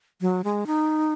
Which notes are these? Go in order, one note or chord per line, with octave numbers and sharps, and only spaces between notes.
F#3
G#3
D#4